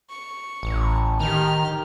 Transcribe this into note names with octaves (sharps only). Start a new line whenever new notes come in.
C#6
A1
D#3 G4 F6